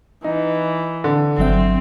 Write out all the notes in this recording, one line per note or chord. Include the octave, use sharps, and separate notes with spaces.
E3 D#4
D3
G1 F#3 C4 E5